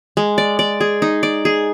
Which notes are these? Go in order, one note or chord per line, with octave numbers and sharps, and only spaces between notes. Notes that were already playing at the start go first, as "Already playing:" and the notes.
G#3
D5
D5
G#4
D#4
D5
G#4